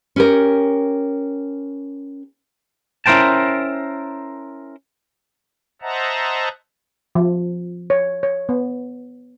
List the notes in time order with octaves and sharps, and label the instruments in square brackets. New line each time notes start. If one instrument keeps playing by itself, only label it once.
[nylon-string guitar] C#4 G4 A#4
[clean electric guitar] C#4 E4 A#4 C5 G5 A5
[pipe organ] C5 D#5 E5 F#5 A5 A#5
[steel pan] F3
C#5
C#5
B3